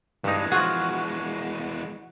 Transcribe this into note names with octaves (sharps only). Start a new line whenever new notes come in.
G2 E3 G#3 D#4
F3 F4 F#4 G#4